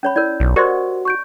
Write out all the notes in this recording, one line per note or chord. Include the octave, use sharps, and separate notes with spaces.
C#4 C#5 B5
E4 A#4 D5 G6
B1
F#4 G4 A#4 C5 D5 D#5 C6
C#6 G6 D7